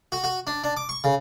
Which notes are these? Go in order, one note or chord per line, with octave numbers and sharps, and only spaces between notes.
F#4
F#4
D4
D4
D6
C#6
C#3